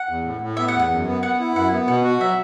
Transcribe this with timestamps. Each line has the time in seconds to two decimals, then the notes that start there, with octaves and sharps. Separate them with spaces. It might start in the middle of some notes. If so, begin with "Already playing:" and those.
Already playing: F#5
0.09 E2
0.24 A2
0.41 A2
0.57 B3 E5
0.68 F#5
0.74 E2
0.79 F#5
0.91 F#2
1.07 B3
1.23 B3 F#5
1.40 E4
1.55 F#2 F#5
1.72 B3
1.88 B2 F#5
2.04 F#4
2.21 F#3 E5